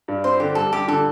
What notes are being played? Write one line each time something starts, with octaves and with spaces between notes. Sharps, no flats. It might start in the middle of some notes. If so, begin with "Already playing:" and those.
G2
C4 C5
D3 G4
G3 A4
G3 G4
D3 A4